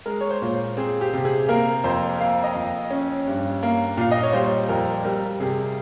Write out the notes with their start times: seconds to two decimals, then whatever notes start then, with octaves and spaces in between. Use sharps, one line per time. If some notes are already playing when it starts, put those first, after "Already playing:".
0.06 G#3 A#4
0.21 C#5
0.30 C5
0.42 A#2
0.53 C5
0.77 C4 G#4
1.01 G4
1.13 C3
1.25 G#4
1.48 A#3 A#4
1.84 F2 C5
2.20 A#3 F5
2.44 D#5
2.55 F2
2.90 C#4
3.27 G2
3.63 A#3
3.97 A#2 F5
4.11 D#5
4.23 C#5
4.33 G3 C5
4.69 F2 A#4
5.04 G3 A#4
5.40 C3 G#4